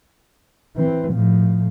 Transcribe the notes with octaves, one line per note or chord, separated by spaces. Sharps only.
E3 C4
A2 F3